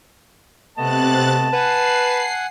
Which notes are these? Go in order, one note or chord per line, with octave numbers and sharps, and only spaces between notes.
C3 A3 B3 D#5 A5 F#6 A6
B4 F#5 G#5 F#6 C7